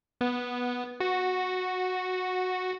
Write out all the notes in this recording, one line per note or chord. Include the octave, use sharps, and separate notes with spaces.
B3
F#4